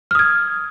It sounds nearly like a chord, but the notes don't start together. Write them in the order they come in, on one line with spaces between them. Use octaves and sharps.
F6 D#6 G#6